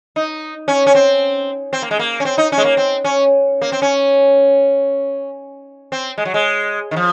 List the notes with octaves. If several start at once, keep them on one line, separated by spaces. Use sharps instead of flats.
D#4
C#4
C#4
C4
C4
A#3
G#3
A#3
C#4
C4
D#4
C#4
G#3
A#3
C4
C#4
A#3
C4
C#4
C4
G#3
F#3
G#3
D#3
F3